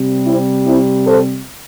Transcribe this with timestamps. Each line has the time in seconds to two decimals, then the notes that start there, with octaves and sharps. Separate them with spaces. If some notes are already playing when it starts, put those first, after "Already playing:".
Already playing: C3 G3
0.26 C4 E4
0.65 C4 E4
1.05 A4 C5